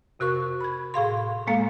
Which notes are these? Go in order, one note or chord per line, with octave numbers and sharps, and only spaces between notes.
F2 C3 F#4 A#4 C#6
B5 G#6
A2 G#4 F5 C6
A2 G#3 A#3 A4 F5 G#5